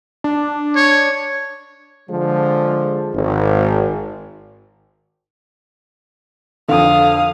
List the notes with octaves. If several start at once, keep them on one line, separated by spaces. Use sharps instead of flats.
D4
C#5
D3 F3 G#3
G#1
F2 D3 F5 D#6